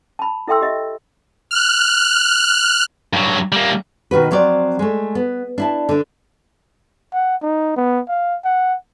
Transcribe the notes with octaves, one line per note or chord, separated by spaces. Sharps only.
A5 B5
E4 A4 E5 G5 C6 E6
G4 D#5 E5
F6 F#6
G2 F#3
G3 A#3
B2 D#3 F#4 B4
F3 F#3 C4 D5
G#3 A3
B3
D4 E4 A5
D3 D4
F#5
D#4
B3
F5
F#5